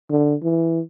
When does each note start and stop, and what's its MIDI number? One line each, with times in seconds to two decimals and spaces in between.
0.10 0.35 50
0.43 0.80 52